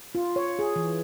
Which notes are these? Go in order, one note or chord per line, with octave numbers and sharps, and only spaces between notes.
F4
C#5
G#4
E3